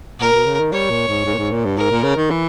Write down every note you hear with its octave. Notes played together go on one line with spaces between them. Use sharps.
A#2 A#4
B2
C#3
D#3
G3 C#5
A#2
G#2
G#2
A#2
G#2
A#2
G2
G#2 A#4
A#2
C#3
D#3
E3